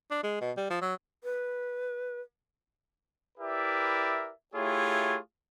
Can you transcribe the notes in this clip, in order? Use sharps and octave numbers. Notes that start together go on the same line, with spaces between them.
D4
G#3
B2
G3
F3
F#3
B4
E4 G4 A#4 B4 D5 E5
A3 E4 F4 G4 G#4 C#5